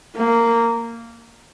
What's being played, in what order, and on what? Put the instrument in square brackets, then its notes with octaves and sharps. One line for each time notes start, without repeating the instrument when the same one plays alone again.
[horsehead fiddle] A#3